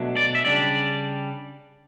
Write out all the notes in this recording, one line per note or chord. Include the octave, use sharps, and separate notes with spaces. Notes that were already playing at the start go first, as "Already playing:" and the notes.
Already playing: B2 F#3 A3 D4
D5
E5
C#3 G3 D4 D5